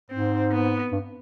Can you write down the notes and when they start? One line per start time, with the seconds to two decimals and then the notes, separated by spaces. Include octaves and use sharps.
0.10 G#2 C4
0.52 B3
0.92 G2